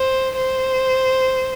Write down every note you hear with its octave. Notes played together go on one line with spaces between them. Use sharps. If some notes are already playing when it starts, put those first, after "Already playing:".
Already playing: C5
C5